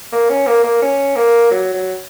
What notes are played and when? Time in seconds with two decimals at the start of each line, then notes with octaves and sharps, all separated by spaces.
0.12 A#3
0.29 C#4
0.47 A#3
0.64 A#3
0.82 C#4
1.16 A#3
1.51 F#3
1.74 F#3